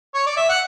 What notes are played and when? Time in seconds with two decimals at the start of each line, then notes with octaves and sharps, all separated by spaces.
0.14 C#5
0.26 D5
0.37 E5
0.49 F#5